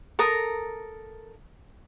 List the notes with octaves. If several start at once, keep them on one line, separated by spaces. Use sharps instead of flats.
A4 A#4 A#5 D#6